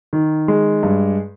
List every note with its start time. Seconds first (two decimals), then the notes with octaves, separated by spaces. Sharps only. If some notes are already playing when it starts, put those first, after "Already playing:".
0.13 D#3
0.48 G#3
0.83 G2